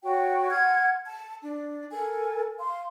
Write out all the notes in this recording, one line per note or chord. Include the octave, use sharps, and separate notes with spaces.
F#4 C#5 G5
F#5 C6 F6 G#6
A5
D4
A4 A#4 G#5
F5 C6